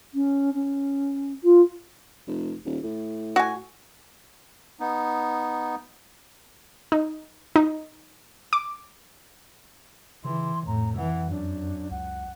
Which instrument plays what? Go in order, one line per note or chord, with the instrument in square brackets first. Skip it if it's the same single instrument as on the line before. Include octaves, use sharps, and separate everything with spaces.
[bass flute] C#4
C#4
F4
[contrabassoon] F1
D#1
A2
[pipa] F#4 G#5
[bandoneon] B3 D#4
[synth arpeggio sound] D#4
D#4
D6
[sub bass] C#3 [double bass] E3 [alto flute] C6
[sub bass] F2 [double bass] A2 [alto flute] A#5
[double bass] E3 [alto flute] F#5
[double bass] F#2 [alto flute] D4
[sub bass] C#2 [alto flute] F#5